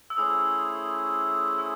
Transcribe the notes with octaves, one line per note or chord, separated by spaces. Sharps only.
E6
A3 C#4 E4 G#4 C5 D#6
E6